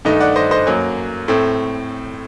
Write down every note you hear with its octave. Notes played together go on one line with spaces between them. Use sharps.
G2 D#3 A3 D#4
D5 F#5
C5 D#5
C5 D#5
F#2 F#3 A#3
A2 A3 C4